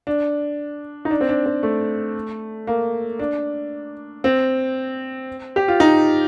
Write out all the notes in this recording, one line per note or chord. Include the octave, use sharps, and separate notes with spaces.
D4
D#4
D4
C4
D4
C4
A3
A#3
D4
C4
G4
F4
D#4